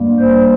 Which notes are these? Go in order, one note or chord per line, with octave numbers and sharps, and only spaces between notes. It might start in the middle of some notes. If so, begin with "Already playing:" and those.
Already playing: G2 G3 A#3
C5